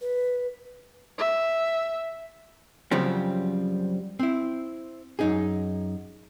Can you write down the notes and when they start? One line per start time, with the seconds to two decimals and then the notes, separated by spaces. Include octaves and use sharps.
0.01 B4
1.19 E5
2.91 F#2 C#3 F3 G3 C4
4.19 C4 E4
5.19 F#2 D#4 G#4